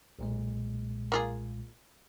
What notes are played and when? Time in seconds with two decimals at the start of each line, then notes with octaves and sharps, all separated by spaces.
0.19 B1 A#2 G#3
1.12 A#3 F4 G#4